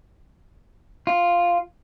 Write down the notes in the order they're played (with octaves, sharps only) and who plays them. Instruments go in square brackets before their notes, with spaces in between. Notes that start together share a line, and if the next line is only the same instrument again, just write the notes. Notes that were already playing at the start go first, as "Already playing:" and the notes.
[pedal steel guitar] F4